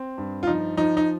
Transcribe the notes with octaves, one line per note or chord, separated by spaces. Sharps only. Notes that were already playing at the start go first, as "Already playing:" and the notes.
Already playing: C4
G2
F4
F3 D#4
F3 D#4
D#4